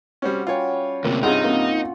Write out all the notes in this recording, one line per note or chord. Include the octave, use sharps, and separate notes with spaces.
G3 C4 C#4 F#4
G3 C#4 F4 C#5 G5
D2 C3 A#3
G2 C3 D#4 F4 G#4 F#5
A#3 C4